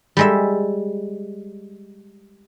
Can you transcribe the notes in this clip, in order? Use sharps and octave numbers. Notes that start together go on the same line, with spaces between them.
G3 G#3 E5